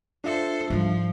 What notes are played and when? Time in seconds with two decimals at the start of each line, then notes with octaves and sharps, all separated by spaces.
0.24 D4 F4 A4 C5 E5
0.70 G#2 F3 G3